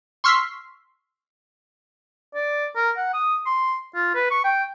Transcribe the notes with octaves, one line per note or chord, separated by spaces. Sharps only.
C6 C#6 E6 F6 B6 C7
D5
A#4
F#5
D#6
C6
F4
B4
C#6
G5